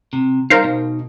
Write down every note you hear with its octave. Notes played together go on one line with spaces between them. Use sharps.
C3
G3 D#4 A#4 C5 F5
B2